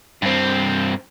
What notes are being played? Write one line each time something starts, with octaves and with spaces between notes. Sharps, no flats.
G2 C4